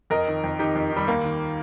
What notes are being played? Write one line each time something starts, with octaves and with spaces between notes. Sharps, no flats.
F2 A#4 D#5
D#3
F2
D#3 D#4 G4
F2
D#3
G3
D#2 A#3
D#3